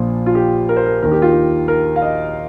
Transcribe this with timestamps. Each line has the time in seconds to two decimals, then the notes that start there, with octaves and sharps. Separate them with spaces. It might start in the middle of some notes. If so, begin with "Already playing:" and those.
Already playing: A#1 A#2 F3 F4
0.26 F4
0.35 G4
0.69 A#4
0.77 C5
0.86 A#4
1.02 D#2 D#3 A#4
1.12 G4
1.22 F4
1.32 G4
1.68 A#4
1.96 F5
2.02 D#5